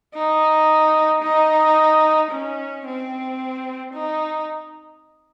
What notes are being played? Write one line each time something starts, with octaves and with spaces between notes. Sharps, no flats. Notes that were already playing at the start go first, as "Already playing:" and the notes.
D#4
D#4
C#4
C4
D#4